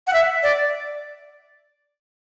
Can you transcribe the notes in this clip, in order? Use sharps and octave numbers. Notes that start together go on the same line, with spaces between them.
F#5
E5
D5